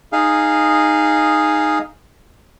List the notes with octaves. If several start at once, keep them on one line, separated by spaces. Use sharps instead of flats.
D#4 G#4 F5